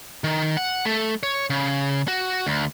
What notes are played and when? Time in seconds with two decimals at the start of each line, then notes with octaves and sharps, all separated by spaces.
0.24 D#3
0.57 F#5
0.85 A3
1.23 C#5
1.50 C#3
2.08 F#4
2.47 D2